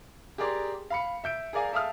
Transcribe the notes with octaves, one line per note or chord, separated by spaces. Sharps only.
G4 G#4 A#4 D5 C6
F5 B5 C#7
E5 G6 D7
G#4 A#4 D5 F5 G#5
A4 E5 F5 D#6 F6